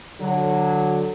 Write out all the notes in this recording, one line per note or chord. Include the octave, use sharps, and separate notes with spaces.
D3 F#3